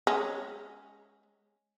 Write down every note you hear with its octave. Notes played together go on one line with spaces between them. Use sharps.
G#3 C#4